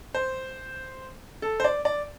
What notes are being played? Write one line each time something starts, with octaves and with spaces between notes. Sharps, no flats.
C5
A4
C5
D5
D5